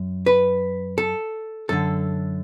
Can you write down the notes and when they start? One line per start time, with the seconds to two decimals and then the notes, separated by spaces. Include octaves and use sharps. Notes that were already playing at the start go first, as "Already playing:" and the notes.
Already playing: F#2
0.26 B4
0.98 A4
1.69 F#2 D3 A4